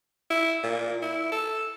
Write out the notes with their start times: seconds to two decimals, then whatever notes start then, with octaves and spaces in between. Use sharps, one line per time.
0.30 E4
0.64 A#2
1.02 E4
1.32 A4